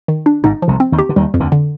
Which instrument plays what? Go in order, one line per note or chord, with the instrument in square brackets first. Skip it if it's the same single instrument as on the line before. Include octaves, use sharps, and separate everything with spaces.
[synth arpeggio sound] D#3
D4
[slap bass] G#1 G#2 [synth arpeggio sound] D#4
[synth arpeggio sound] F3
[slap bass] C2 C3
[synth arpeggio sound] C4
[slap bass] D#2 D#3
[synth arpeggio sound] G4
[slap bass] D3
[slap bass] D#2 D#3 [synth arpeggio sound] G3
[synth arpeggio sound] F2
[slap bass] D2 D3
[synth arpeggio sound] D3